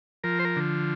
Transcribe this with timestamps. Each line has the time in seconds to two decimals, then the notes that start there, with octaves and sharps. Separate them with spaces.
0.24 F3 A#4
0.39 C5
0.45 A#4
0.56 D3